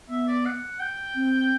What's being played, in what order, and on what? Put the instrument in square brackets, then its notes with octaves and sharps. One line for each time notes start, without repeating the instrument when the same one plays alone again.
[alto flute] B3 [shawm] E5
[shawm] D5
F#5
G5
[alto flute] C4